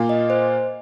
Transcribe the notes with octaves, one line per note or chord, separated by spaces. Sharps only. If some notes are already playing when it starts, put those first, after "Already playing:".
Already playing: A#2 A#3 F4
D#5
C5